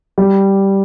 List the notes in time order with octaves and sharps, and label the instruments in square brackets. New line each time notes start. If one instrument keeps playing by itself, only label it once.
[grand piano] G3